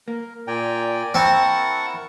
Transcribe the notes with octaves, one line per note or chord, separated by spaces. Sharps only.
A#3 A#4
A#2 D5 G5 G#5 A#5
C4 E4 A#4 F#5 A5 C#6